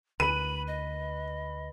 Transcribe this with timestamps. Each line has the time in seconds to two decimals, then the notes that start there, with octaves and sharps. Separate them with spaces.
0.20 D2 B4 B5 D#7
0.67 D#5